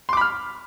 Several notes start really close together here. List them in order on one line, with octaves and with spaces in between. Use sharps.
C6 D6 B5 F6